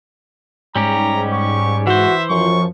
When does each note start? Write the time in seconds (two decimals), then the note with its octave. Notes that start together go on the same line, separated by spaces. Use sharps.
0.76 G#2 G3 C#4 G4 A#5
1.33 C#6
1.87 E3 F#4 C5 E5
2.30 F#2 F3 C#6